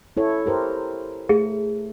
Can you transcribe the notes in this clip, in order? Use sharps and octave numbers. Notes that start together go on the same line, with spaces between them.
E4 A4 C#5
G4 A#4 C5
A3 G#4